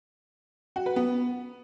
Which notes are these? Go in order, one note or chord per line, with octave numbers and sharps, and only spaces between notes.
F#4
B4
B3